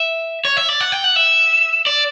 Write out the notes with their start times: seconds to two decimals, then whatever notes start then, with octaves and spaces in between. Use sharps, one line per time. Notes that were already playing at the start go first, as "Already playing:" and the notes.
Already playing: E5
0.45 C#5
0.57 E5
0.69 D5
0.81 F#5
0.92 G5
1.04 F#5
1.16 E5
1.87 D5